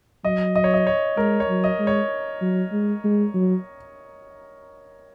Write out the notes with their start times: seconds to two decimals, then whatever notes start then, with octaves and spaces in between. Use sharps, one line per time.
0.24 F#3 D#5
0.55 D#5
0.64 C#5
0.74 D#5
0.87 C#5
1.17 G#3 A#4
1.40 C#5
1.49 F#3
1.64 D#5
1.79 G#3
1.87 C#5
2.41 F#3
2.72 G#3
3.04 G#3
3.34 F#3